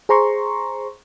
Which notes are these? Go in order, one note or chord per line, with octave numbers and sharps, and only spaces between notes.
G#4 C5 A#5 C6 C#6